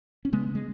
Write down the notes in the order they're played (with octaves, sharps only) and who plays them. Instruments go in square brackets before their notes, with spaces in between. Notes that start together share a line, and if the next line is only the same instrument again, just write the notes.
[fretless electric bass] C#4
C#3 G#3 B3
G#3